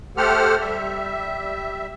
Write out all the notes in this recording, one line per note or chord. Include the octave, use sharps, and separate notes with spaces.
A3 G4 A4 C5 F#5 F6
G3 E5